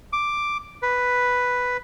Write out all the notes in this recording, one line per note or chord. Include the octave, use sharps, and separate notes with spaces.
D6
B4